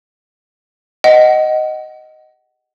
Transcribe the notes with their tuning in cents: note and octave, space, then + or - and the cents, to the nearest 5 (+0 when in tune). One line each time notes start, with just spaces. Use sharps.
D#5 +0 F#5 +20